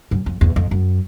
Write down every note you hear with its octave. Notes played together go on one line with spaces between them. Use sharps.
F#2
F2
E2
F2
F#2